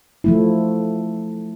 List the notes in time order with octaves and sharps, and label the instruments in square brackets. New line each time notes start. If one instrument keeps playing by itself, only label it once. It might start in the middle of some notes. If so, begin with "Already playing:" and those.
[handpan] F3 A3 E4